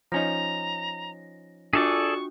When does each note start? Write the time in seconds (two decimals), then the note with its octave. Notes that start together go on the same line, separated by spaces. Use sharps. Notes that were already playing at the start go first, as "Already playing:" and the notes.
0.12 F3 C#4 D#4 A#5 A#6
1.73 D4 F4 F#4 G#4 A4 D5 C#6